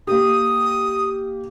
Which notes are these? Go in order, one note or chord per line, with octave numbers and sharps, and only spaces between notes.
A#3 G4 D#6